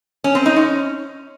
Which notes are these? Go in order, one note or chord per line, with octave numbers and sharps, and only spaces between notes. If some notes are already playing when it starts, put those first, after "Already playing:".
C#4
C4
D#4
C#4